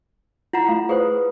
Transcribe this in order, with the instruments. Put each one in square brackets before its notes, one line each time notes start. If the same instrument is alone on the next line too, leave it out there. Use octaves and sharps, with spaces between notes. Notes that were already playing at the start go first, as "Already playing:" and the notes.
[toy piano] E4 F#5 A#5 [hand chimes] F4
[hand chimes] A3 [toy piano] F5
[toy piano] G#4 C5 [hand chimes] B4 D#6